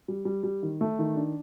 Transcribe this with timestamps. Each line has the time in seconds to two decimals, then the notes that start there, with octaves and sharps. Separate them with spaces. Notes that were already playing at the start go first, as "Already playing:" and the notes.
0.08 G3
0.25 G3
0.43 G3
0.63 D#3
0.81 A3
0.99 D#3
1.16 D4